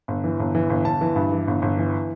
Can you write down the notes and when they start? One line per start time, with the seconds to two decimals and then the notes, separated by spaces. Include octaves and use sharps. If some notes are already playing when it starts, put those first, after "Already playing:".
0.08 G1
0.24 E3
0.40 G1
0.55 E3
0.70 G1
0.85 G1 A5
1.01 E3
1.16 G2
1.32 E3
1.48 G1
1.62 G1
1.77 E3